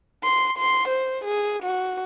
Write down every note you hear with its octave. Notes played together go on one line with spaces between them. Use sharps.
C6
C6
C5
G#4
F#4